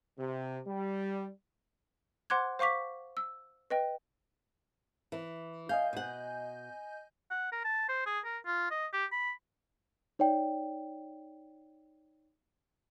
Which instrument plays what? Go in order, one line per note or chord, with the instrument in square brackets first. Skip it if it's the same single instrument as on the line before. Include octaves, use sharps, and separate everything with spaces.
[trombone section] C3
G3
[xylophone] C5 F#5 C6 D6 F#6 G#6
C5 F5 C#6 D6 B6
E6
B4 D#5 G5
[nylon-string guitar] E3
[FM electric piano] D#5 G#5 G6 [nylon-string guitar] F5
[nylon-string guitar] B2 F#5
[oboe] F#5
A#4
A5
C5
G#4
A#4
F4
D#5
G4
B5
[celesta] D#4 C#5 D5 G5